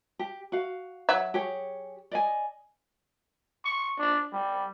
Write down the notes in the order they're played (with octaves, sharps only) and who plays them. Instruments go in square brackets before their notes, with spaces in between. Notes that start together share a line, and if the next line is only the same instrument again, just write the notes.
[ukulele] G4
F#4 F5
[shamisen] F#3 E5
[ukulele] G4 G#4 C#5
D5 D#5 G#5
[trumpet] C#6
D4
G3